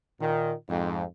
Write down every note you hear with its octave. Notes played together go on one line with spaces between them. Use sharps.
A#2 D#3
F2 G#2